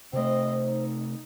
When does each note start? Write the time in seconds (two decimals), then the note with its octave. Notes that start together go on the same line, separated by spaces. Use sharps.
0.13 C3 A3 C4 C5 D#5
0.63 D#4